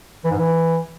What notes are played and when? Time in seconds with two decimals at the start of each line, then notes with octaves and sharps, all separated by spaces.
0.24 E3
0.31 G#2
0.37 E3